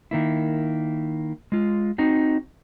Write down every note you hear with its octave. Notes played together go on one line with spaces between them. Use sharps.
D#3 A#3 E4
G#3 F4
C4 D#4 F#4